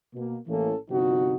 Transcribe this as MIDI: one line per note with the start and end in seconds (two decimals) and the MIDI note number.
0.14 0.36 47
0.14 0.36 58
0.47 0.74 33
0.47 0.74 52
0.47 0.74 57
0.47 0.74 58
0.47 0.74 61
0.47 0.74 69
0.89 1.37 31
0.89 1.37 48
0.89 1.37 53
0.89 1.37 63
0.89 1.37 66